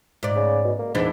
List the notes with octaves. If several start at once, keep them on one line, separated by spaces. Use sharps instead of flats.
G#2 D5
C#3
B2
A#3
E2 G#2 E3 D4